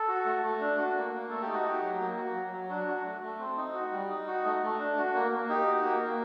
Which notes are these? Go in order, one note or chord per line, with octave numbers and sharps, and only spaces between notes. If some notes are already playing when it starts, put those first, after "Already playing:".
Already playing: A4
F#4
A3
A3
D4
F#4
A#3
A#3
A3 A4
G4
D#4
F#4
F#4 G4
F#3
A#3
F#4
F#3
F#3
D4 F#4
F#4
A3
A3
C4
D#4
F#4
G3
D#4
F#4
A3
A3
D4
F#4
A#3
A#3
D#4 G4
F#4
A#3
A#3